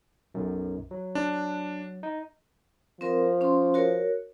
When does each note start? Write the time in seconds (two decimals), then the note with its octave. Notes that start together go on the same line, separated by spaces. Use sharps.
0.34 B1 F#2
0.91 F#3
1.15 D4
2.03 D#4
3.01 F3 C4 A#4
3.41 C#4 C6
3.74 F#4 A#4 C#5